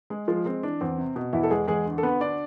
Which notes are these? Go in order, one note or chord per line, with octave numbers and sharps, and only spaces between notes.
G#3 G#4
F3 G#3 F4
G#3 C4
E3 D4
E2 C4
C3
B2
E2 E3 E4
A4
E2 G#3 G#4
E2 G#3 G#4
D2
A4
D2 B3 B4
D2 D4 D5